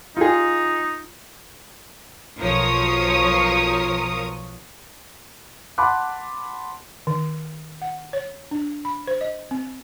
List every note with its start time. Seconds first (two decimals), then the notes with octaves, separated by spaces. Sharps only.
0.17 D#4 F4 G#4
2.38 B1 F3 A#4 C#5 D#6
5.78 F#5 A5 B5 C6 D6 F#6
7.07 D#3
7.82 F#5
8.13 C#5
8.51 D4
8.85 B5
9.08 C5
9.21 D#5
9.51 C4